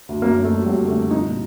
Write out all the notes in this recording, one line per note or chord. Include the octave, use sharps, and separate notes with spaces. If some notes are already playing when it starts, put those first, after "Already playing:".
D2
F#2 A#3
F#2
A3
F#2
G3
F#2 F#3
D3
A3
D3
C2 D#4
A#2